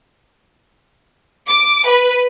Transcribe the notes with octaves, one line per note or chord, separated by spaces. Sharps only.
D6
B4